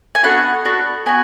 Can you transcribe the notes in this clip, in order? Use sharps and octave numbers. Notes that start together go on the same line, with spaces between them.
G#5
B3 D4 F#4 A4 F#5
B3 D4 F#4 A4
B3 F#4 G#5